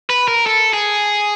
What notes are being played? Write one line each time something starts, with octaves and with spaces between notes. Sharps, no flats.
B4
A#4
A4
G#4